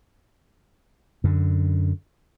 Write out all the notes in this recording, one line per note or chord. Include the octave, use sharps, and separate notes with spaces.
F#2 D3